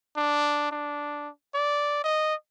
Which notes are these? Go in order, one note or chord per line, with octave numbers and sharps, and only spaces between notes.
D4
D4
D5
D#5